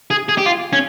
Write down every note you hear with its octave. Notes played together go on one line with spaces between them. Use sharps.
G#4
G#4
G4
F4
C#4